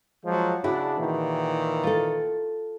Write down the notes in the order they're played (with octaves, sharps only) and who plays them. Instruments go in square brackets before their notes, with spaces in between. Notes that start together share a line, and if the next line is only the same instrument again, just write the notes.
[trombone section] F3 F#3 G#3
[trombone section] C#3 D4 [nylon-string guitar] E4 F#4 G#4
[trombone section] A#2 D#3 E3
[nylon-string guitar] F4 A4